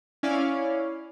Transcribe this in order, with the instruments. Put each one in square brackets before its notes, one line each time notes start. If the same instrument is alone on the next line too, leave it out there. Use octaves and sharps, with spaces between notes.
[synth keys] C#4 E4 D5 F5